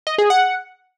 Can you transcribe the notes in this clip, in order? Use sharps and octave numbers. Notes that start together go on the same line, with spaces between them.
D#5
G#4
F#5